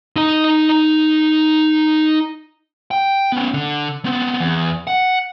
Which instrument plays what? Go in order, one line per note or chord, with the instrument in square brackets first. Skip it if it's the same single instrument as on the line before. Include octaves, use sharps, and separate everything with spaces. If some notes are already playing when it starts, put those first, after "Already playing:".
[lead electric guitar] D#4 A#5
G5
B3 C#4
D3
B3 C4
E2
F#5